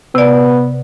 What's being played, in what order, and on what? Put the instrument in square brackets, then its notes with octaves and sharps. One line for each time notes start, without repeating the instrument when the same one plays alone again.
[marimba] C3 D5 [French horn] B3